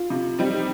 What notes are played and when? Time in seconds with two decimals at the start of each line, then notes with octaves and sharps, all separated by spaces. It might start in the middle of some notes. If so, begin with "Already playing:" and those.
Already playing: F4
0.10 C3
0.39 G3 C4 D#4